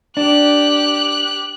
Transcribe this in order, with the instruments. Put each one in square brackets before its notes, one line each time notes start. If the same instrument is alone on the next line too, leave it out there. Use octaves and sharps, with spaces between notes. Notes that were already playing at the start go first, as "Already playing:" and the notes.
[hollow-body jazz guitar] D4 [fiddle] G4 F#6